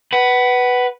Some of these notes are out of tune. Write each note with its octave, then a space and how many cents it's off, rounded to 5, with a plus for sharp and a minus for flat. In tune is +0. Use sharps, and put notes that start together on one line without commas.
B4 +0 F#5 +25